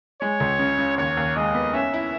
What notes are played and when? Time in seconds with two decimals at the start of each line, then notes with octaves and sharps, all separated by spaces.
0.21 G#3 C#5
0.40 C#2
0.59 C#3
0.78 C#3
0.98 D#2 C#5
1.17 D#2
1.36 G#3 D#5
1.54 B3
1.73 C#4 E5
1.94 E4